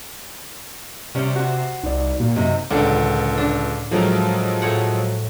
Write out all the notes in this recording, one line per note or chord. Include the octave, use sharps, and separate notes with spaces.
C3 G3 C#4 C5
F#4 C5
C2 D#4 D5
A#2 A#3 F#4
F#2 C3 C4 D#4
C#2 A2 D3 D#3 A4
D4
A2 F3 F#3 G#3 A#4
A2 C#5 F#5